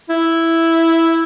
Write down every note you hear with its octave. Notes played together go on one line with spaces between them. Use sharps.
E4